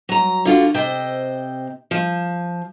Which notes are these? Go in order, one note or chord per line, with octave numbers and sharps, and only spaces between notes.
F#3 A#5
D3 F4 F#4
C3 C5 D#5 G5
F3